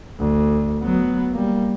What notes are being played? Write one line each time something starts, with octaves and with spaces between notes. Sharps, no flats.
D2
F#3 B3
G3 A#3